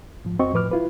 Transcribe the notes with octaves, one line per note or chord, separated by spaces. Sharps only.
G#2 F3
F2 C4 F#4 D#5 C#6
A2 F3 B4 D6 F6
E4 F4 B4